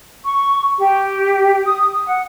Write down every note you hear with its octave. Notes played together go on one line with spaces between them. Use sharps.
C#6
G4
D#6
D#6
F#5